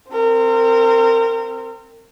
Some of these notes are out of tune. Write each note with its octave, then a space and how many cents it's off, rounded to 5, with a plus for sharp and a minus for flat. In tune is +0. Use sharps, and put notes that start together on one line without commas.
C4 +0 A#4 -30